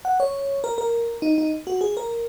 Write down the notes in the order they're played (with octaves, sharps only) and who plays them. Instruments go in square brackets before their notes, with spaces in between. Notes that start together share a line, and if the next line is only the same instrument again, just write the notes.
[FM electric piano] F#5
C#5
A#4
A#4
D#4
D#4
F#4
G#4
A#4